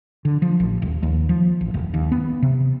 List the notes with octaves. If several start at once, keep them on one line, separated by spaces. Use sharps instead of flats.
D3
F3
A1
D#1
D#2
F3
A1
E1
D#2
B3
C3